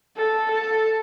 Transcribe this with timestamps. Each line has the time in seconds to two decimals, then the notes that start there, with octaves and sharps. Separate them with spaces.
0.17 A4
0.52 A4